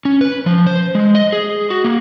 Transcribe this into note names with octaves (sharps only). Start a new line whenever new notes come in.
C#4
B4
F3
C5
G#3
D#5
G#4
F#4
A#3